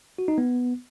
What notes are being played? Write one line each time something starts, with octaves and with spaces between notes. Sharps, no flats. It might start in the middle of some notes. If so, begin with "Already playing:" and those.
F#4
D#4
B3